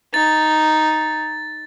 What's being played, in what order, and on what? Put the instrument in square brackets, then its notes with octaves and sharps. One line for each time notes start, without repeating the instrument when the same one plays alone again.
[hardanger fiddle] D#4 [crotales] A6